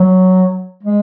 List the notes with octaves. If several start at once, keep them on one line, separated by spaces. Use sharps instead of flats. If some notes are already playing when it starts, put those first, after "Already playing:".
Already playing: F#3
G#3